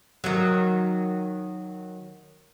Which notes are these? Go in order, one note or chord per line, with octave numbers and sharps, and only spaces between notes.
D#3 F#3